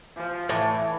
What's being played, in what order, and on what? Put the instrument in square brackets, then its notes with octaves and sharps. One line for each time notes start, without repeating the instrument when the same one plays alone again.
[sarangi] F3
[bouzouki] A2 [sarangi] E3